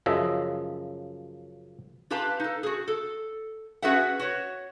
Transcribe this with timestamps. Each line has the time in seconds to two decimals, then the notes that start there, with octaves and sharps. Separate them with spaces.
0.06 F#2 C#3 F3 D#5 E5
2.11 F4 G4 B4 F5 A5
2.40 D#4 A4
2.63 F#4 G#4
2.88 A4
3.82 C#4 F#4 G#4 B4 E5 F#5
4.19 F#4 C#5